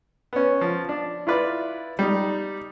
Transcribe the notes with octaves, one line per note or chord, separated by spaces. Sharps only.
B3 C#4
F3
D4
E4 F4 B4 D5
G3 D#4